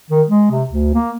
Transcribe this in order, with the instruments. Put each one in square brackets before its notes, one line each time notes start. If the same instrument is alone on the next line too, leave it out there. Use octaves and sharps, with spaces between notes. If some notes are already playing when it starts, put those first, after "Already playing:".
[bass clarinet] D#3
G#3
C3
D2
A#3